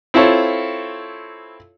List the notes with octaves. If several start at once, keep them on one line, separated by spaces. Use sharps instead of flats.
C4 E4 F4 A4 C#5